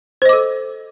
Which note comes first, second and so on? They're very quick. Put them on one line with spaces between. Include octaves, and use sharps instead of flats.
C5 D#5 D6 A4